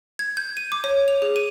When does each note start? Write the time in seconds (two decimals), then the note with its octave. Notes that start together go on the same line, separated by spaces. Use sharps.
0.19 G#6
0.37 G6
0.57 D#7
0.72 D6
0.84 C#5
1.08 F7
1.22 G#4
1.36 D#7